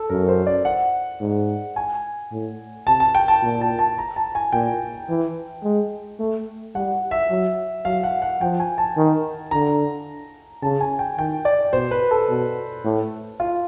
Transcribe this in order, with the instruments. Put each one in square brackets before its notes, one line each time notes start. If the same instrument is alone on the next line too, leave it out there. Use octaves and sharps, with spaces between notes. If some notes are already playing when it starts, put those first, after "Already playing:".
Already playing: [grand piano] A4
[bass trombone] F#2 [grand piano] A#4
[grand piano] C5
D5
F#5
[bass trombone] G#2
[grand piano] G#5
[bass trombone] A2
[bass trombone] C3 [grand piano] A5
[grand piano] A5
G5
A5
[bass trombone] A#2
[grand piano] A5
A5
A#5
A5
G#5
[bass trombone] A#2 [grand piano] G5
[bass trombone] E3
G#3
A3
[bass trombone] G3 [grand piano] F#5
[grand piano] E5
[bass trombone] F#3
[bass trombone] F#3 [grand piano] F5
[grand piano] F#5
F#5
[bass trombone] F3 [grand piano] G5
[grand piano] G#5
A5
[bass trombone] D#3
[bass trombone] D3 [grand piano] A#5
[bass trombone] C#3 [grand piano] A5
[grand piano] G#5
G5
[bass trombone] D#3 [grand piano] G5
[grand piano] D5
[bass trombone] B2 [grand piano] C5
[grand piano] B4
A4
[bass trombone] B2
A2
[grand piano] F4